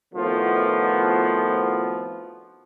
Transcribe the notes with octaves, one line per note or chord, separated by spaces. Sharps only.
F2 A2 D#3 F3 B3 F#4